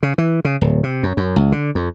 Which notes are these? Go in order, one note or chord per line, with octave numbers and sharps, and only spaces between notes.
C#3
E3
C#3
D1
C3
F#2
F#2
C#2
D3
F2